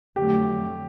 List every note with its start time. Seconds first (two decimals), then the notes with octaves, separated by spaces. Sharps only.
0.16 F2 D3 F#3 A3 G4